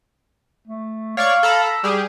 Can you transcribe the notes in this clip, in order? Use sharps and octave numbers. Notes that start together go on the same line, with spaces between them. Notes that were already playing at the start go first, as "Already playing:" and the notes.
A3
C#5 D5 F5 C#6
A4 A#5 B5
E6
G3 G4 G#4